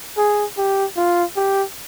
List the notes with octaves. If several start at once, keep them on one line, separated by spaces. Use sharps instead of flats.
G#4
G4
F4
G4